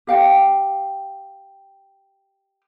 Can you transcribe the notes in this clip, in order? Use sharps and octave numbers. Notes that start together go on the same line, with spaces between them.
G4 F5 G5